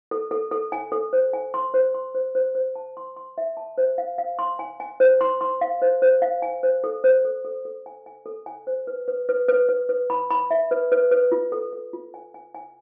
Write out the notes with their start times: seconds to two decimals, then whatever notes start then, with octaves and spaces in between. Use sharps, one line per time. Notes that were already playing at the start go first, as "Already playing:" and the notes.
0.11 A4
0.31 A4
0.51 A4
0.72 G#5
0.92 A4
1.13 C5
1.33 G#5
1.54 C6
1.74 C5
1.95 C6
2.15 C5
2.35 C5
2.55 C5
2.76 A5
2.97 C6
3.16 C6
3.38 E5
3.57 A5
3.78 C5
3.98 F5
4.18 F5
4.39 C6
4.59 G#5
4.80 G#5
5.00 C5
5.21 C6
5.41 C6
5.61 F5
5.82 C5
6.02 C5
6.22 F5
6.42 G#5
6.63 C5
6.84 A4
7.04 C5
7.25 A4
7.45 A4
7.65 A4
7.86 G#5
8.06 G#5
8.26 A4
8.46 G#5
8.67 C5
8.87 B4
9.08 B4
9.29 B4
9.48 B4
9.69 B4
9.89 B4
10.10 B5
10.30 B5
10.51 E5
10.71 B4
10.92 B4
11.11 B4
11.32 F4
11.52 A4
11.73 A4
11.93 F4
12.14 G#5
12.34 G#5
12.55 G#5